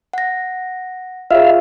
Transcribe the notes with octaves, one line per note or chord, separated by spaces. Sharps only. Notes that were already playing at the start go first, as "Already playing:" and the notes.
F#5 A#6
F4 G#4 C#5 E5 F5